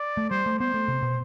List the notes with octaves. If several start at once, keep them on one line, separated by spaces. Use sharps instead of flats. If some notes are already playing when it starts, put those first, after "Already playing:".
Already playing: D5
A3
G3 C5
A3
B3 C5
A3
C3
B2